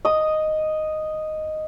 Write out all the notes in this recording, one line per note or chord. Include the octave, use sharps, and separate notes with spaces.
D#5 D#6